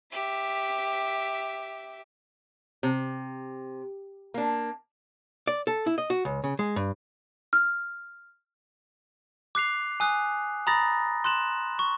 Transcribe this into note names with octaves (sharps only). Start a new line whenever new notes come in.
G4 E5
C3
A#3 D4
D5
A4
E4
D#5
F#4
C#2
C#3
G#3
G2
F6
D6 F#6 C7 F7
G#5 D#6 F#6
A#5 B5 D#6 A6 A#6
C6 F#6 E7 F#7
C#6